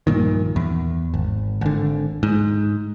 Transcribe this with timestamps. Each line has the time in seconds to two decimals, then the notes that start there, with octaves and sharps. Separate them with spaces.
0.07 A#1 G2 A#2 D#3
0.56 E2
1.14 G#1
1.61 G#1 D3
2.23 G#2